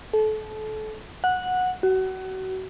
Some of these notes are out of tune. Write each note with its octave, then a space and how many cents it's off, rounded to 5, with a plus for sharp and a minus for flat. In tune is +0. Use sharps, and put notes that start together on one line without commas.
A4 -30
F#5 -15
F#4 +30